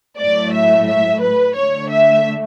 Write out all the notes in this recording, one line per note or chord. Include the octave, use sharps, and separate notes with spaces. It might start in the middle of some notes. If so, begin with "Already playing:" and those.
A2 F#3 A3 D5
E5
E5
B4
D3 A3 C#5
E5